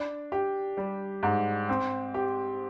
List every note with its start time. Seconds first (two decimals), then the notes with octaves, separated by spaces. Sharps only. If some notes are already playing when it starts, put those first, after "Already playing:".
Already playing: D4
0.32 G4
0.77 G3
1.23 G#2
1.69 C4
2.14 G4